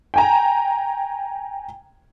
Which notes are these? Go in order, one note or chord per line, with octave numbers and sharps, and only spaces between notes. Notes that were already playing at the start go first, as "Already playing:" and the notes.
G5 G#5 A#5